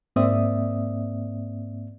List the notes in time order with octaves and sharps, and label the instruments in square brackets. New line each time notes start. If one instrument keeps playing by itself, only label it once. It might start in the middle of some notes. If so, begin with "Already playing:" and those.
[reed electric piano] G#2 A#3 C4 D5 E5 D#6